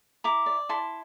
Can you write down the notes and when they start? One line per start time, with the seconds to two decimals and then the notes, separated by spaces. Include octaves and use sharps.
0.24 E4 A#5 D6
0.46 D5
0.69 E4 A5 C6